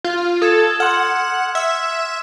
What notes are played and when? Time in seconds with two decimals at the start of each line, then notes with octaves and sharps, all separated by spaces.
0.04 F4
0.42 A4 D#6 G#6 E7
0.80 F#5 C6 F6
1.55 E5 E6